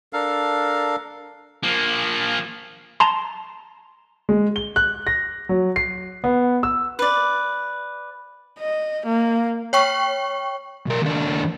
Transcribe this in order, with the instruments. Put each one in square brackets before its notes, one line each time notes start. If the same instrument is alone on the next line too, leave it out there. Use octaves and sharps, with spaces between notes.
[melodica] D4 A4 A#4 F5
[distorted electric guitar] F3 A#3
[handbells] A5 A#5 C6
[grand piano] G#3
G7
F#6
A#6
F#3
C7
B3
E6
[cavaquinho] B4 D5
[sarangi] D#5
A#3
[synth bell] C#5 G5 C#6
[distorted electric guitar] B1 A#4
D#2 D4